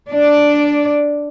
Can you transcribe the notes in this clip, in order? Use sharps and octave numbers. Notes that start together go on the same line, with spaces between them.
D4 D5